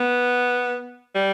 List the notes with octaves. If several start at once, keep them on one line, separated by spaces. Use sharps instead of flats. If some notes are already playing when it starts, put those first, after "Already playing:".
Already playing: B3
G3